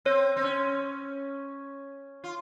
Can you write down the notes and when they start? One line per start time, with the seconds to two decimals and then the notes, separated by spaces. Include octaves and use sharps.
0.05 C4 C#5
0.36 C4
0.44 C#4
2.24 F4